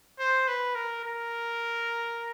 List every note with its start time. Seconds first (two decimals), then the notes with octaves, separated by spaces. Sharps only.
0.19 C5
0.48 B4
0.75 A#4
1.04 A#4